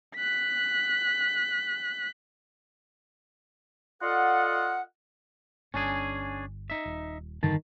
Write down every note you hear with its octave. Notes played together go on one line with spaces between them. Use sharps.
F#6 B6
F4 A4 D5 D#5 F5 F#5
G1 C#4 D4 G#4
D#4 E5
D#1
F1 G2 D3 D#3 A5